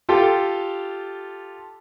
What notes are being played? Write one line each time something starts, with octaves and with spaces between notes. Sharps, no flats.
F4 G4 A4